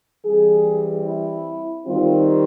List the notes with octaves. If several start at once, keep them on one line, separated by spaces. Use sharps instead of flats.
E3 G3 C4 G#4
E4
D#3 G3 C4 D#4 F4